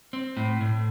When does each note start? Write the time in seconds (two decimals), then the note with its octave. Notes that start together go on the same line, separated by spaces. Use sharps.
0.13 C4
0.37 A2
0.61 A2